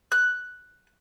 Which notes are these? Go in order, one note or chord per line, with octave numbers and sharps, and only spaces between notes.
F#6